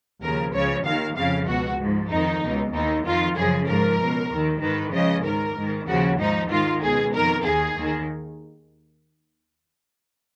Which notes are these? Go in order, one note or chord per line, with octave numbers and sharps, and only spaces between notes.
D#2 C#3 F3 A#4
C#2 C#3 F3 C#5
D#2 D#3 F5
F2 C#3 F3 F5
C#2 B2 F#4
G#2 F3
F2 D#3 D#4
C#2 B2
D#2 D#3 D#4
F2 D#3 F4
F#2 C#3 F3 G#4
G#2 F3 A#4
C#2 B2
D#2 D#3
G#2 D#3 B4
C#2 C#3 F3 D#5
G#2 D#3 A#4
G#2
D#3
D#2 C#3 F3 F#4
G#2 F3 D#4
G#2 D#3 F4
C#2 B2 G#4
F2 D#3 A#4
D#2 D#3 G#4
D#2 D#3